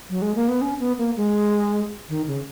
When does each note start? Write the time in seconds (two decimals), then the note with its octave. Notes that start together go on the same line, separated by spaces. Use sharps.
0.10 F#3
0.22 G#3
0.35 A#3
0.48 B3
0.61 C#4
0.80 B3
0.98 A#3
1.16 G#3
2.09 D#3
2.27 C#3